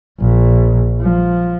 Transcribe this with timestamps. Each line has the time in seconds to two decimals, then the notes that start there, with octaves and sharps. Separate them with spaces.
0.20 A#1
1.01 F3